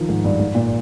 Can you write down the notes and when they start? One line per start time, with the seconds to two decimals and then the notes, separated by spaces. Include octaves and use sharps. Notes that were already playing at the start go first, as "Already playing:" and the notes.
Already playing: D#3 F3
0.09 G#2
0.25 G2
0.40 G#2
0.55 A#2